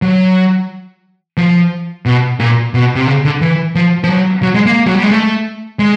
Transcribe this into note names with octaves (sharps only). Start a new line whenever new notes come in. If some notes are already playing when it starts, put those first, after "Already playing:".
F#3
F3
B2
A#2
B2
C3
C#3
D3
E3
F3
F3
F#3
F#3
G#3
A#3
F#3
G3
G#3
A3
G#3